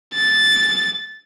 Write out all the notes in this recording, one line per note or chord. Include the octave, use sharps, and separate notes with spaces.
A6